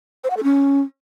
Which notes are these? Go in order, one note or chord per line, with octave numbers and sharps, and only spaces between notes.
C5
F#5
A4
C#4